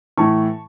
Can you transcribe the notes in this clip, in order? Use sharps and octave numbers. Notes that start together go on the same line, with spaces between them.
A2 E3 A5 C#6